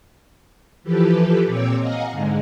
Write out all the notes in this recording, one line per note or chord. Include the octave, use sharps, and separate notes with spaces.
E3 F3 G4 A4 B4
A#2 C4 C#5 D6 E6
D#5 F5 F#5 G#5 A#5
G#2 D3 G#3